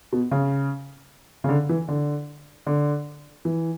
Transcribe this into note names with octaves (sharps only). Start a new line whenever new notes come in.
B2
C#3
C#3
D3
E3
D3
D3
E3